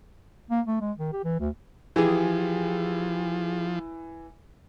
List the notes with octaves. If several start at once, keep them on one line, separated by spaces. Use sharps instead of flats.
A#3
A3
G#3
D#3
G4
E3
D2
E3 F3 G4 G#4